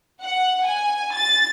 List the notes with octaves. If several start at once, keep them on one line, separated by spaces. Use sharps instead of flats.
F#5
G#5
A6